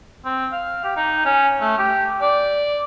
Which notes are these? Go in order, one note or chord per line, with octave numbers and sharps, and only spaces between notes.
C4
F5
G4
D#4
C#4
A3
G4
D5